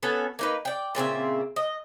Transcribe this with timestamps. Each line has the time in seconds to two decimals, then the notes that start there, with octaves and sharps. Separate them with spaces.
0.03 B3 C#4 F#4 A4
0.39 A#3 D#4 B4
0.65 D5 G5
0.95 A#2 C#3 C4 E5
1.56 D#5